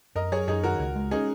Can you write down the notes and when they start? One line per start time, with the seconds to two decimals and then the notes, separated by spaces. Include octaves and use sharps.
0.15 F#2 A#4 D#5
0.32 F#3 G#4 C#5
0.47 F#2 D#4 G#4
0.63 D#3 F#4 A#4
0.79 C#2
0.95 G#3
1.11 C#4 D#4 G#4